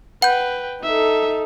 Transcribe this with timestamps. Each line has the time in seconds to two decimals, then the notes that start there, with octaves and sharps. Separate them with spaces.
0.22 B4 F#5 G5 B5 G6
0.83 D#4 A4 E5